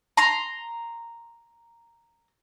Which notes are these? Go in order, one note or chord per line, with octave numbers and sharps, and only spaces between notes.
A#5 C6